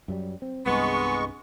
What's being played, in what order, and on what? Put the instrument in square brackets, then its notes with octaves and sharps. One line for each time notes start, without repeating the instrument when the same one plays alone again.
[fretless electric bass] F#2 F#3 G3
C4
[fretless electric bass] C2 G2 [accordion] G#3 C#6 [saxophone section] B3